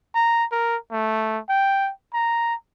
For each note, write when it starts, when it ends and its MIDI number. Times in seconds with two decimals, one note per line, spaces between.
0.15 0.45 82
0.52 0.76 70
0.92 1.39 57
1.49 1.91 79
2.14 2.54 82